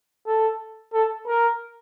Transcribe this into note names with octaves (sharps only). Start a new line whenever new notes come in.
A4
A4
A#4